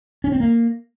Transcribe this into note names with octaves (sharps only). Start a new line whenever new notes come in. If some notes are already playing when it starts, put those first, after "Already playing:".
C#4
C4
A#3